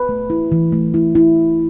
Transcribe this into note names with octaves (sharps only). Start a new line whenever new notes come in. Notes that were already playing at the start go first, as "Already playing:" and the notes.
Already playing: B4
A3
E4
E3
A3
E4
E4